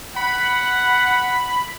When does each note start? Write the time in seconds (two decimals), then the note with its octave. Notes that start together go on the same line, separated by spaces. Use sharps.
0.16 F#5 B5